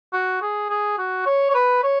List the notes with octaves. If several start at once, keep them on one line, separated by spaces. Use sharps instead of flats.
F#4
G#4
G#4
F#4
C#5
C#5
B4
C#5